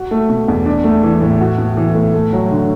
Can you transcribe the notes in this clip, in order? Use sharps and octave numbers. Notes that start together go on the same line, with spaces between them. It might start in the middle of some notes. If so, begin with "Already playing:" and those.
Already playing: F#4
A3
B2
E2
D4
A3
E3
A2
F#4
B3
E3
A2
A3
F#3
D3